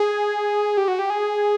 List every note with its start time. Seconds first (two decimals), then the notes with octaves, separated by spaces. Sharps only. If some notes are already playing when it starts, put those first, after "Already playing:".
Already playing: G#4
0.77 G4
0.88 F#4
0.99 G4
1.10 G#4